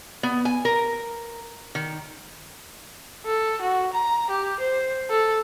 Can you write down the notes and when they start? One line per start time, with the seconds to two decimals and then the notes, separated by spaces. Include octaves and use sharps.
0.23 B3
0.45 G#5
0.65 A#4
1.75 D#3
3.25 A4
3.61 F#4
3.93 A#5
4.30 G4
4.60 C5
5.10 A4